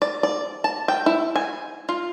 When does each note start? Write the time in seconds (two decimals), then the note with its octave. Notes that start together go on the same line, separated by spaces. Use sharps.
0.02 D5
0.23 D5
0.64 A5
0.88 G5
1.06 E4
1.36 G#5
1.89 F4